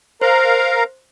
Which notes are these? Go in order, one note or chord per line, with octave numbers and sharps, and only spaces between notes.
A#4 C5 F5 A#5